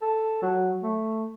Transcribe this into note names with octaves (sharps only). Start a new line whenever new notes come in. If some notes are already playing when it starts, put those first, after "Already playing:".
A4
F#3
A3